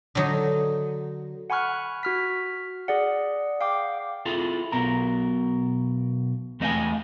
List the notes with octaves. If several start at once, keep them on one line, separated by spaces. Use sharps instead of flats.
D3 F#3 D#4
F#5 G#5 B5 C#6 F6 F#6
F#4 F6 B6
G#4 D5 F#5
F5 G5 D6
E4 F4 G#4 A4
B1 B2 A#4 A#5
E2 A3 D#5 F5 G5 G#5